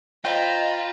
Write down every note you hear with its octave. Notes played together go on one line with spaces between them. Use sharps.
F4 C5 D#5 G5 A#5 B5